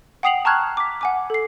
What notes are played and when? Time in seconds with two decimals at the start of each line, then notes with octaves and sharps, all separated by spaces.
0.23 F#5 G5 D#6 C7 F7 F#7
0.45 A5 A#5 C#6 F6 F#6 G#6
0.77 D6 B6
1.01 F#5 G#5 D6
1.30 A4 C7